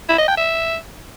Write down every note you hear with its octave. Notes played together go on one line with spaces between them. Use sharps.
E4
D#5
G5
E5